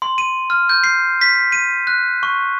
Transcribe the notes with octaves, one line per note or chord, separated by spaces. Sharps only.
C6
D#7
F6
G6
C7
B6
D#7
F#6
C#6